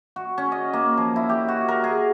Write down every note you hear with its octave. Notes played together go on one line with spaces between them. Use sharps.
F#4
C#4
D#5
A#3
F3
E4
G4
F#4
A#4
G#4